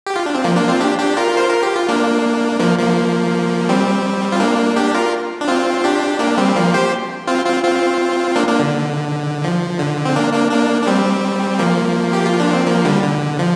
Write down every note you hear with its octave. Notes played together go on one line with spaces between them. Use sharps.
G4
F4
D4
C4
F3 A#3
A#3 D4
C4 F4
D4 G4
D4 G4
F4 A#4
C5
A#4
G4
F4
A#3 D4
F3 A#3
F3 A#3
G3 C4
F4
A#3 D4
D4 G4
F4 A#4
D4
C4 F4
D4 G4
A#3 D4
G3 C4
F3 A#3
G4 C5
C4 F4
C4 F4
C4 F4
A#3 D4
A#3 D4
D3
F3
D3
C4
A#3 D4
A#3 D4
A#3 D4
D4
G3 C4
F3 A#3
G4
F4
D4
C4
F3 A#3
D3 G3
D3
F3